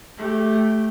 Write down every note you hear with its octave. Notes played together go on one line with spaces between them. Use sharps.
A3 G4